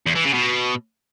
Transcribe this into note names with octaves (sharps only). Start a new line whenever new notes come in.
E2
E3
C#3
B2